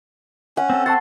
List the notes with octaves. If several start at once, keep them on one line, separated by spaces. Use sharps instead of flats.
C#4 F#5
C4 A4
F#5 A5 C6 C#6 A6